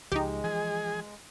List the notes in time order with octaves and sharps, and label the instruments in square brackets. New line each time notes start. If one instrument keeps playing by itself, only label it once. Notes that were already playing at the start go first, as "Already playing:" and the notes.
[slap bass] C#2 F3 [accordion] G#3 [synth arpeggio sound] D#4 G4
[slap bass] E3 F3 [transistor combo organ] G#4